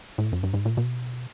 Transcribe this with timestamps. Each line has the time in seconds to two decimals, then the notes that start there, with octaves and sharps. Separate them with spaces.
0.18 A2
0.32 F#2
0.43 G2
0.54 G#2
0.65 A#2
0.77 B2